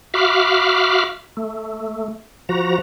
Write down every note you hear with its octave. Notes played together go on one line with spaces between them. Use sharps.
F#4 E5 F5 B5 D6 F6
A3
F3 F#4 A#5